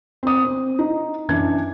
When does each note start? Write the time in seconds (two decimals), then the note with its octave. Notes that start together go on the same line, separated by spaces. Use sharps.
0.23 C4 D#6
0.44 C4
0.79 D#4
1.29 F#2 E3 D4 G#6